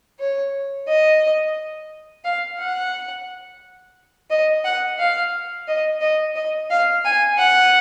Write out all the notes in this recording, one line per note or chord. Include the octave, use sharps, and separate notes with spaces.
C#5
D#5
F5
F#5
D#5
F#5
F5
D#5
D#5
D#5
F5
G#5
F#5